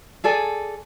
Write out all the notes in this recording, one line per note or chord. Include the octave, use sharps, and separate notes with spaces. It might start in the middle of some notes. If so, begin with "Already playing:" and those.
G#4 A4 D5 G#5